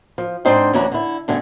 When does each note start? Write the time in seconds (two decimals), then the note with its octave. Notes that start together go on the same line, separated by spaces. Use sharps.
0.18 F3
0.45 G#2 C4 D4 C5 D#5 G5
0.73 D2 E3 C#4 D4 F#4 A#5
0.92 D3 E4
1.28 G2 B2 D3 A3 G#5